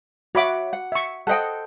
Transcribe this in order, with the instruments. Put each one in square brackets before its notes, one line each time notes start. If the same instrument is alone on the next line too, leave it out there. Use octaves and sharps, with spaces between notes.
[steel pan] F#4 B5 D6 [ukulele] C#5 E5 F#5
[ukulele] F#5
[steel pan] E5 C#6
[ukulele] A4 C5 G5 [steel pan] D#5 F#5